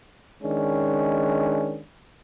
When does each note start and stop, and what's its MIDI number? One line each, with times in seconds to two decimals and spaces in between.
0.42 1.80 51
0.42 1.80 56
0.42 1.80 61
0.42 1.80 62